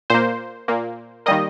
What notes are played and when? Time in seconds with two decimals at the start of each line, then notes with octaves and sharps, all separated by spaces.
0.10 A#2 A#3 C5
0.68 A#2 A#3
1.26 D#3 G3 A#3 D#5